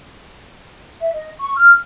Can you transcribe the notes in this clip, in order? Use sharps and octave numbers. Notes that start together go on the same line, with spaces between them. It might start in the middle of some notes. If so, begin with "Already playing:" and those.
E5
D#5
C#6
F6